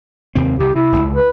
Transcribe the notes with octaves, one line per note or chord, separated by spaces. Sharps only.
D#2 C3 C4
C2 C3 G4
C3 E4
D1 C#2
B4